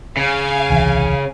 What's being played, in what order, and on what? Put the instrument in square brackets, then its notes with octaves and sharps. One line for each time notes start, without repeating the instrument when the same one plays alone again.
[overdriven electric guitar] C#3 [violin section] F5 G#5
[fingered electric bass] D#1 C2 E3